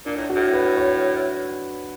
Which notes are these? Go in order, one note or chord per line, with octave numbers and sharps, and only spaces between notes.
A#2 D4
A2
F#4
A2
B4
C#5